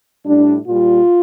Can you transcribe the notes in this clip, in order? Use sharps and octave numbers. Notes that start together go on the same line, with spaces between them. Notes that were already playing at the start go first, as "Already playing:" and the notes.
A2 G3 D4
A#2 G3 F4